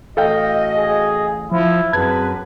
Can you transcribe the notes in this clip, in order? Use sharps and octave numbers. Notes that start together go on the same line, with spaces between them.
A1 F#4 A4 D#5 F5 G5
G#4
F3 E4
F#2 C4 G#4 B4 A5 G#6